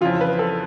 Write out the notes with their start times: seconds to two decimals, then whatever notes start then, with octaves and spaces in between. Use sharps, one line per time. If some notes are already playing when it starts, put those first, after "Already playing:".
0.01 F2 C#3 E3 F4
0.21 B4
0.39 A4